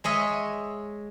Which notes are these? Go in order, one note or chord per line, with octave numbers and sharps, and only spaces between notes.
G#3 C#5 D#5 E5